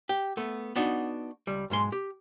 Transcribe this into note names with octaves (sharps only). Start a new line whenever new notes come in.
G4
A3 B3
B3 D4 D#4 F#4
C#2 G3
B1 G#2 G#3 C6
G4